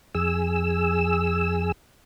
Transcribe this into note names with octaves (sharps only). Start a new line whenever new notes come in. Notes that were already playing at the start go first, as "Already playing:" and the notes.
F2 G#4 E6